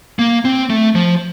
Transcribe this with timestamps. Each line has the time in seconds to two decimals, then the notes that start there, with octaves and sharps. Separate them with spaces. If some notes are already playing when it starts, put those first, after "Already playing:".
0.19 A#3
0.45 C4
0.70 A3
0.95 F3